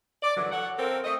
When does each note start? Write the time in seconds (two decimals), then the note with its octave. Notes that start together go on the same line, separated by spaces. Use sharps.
0.23 D5
0.37 F#2 D3 E3 F#3
0.52 A4 C#5 F#5
0.78 C4 F4 A4 A#4
1.04 A3 C4 D#5